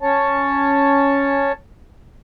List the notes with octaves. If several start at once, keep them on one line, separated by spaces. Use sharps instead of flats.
C#4 C#5 A5